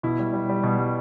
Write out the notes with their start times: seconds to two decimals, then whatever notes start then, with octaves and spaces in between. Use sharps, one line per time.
0.03 B2 E4
0.19 G3
0.33 G3
0.49 G3
0.63 B2
0.78 G3